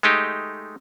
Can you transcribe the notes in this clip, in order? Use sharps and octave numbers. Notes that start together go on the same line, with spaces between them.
G#3 A3 D#4 G4